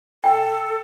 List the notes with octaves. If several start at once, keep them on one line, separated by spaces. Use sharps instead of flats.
A4 G5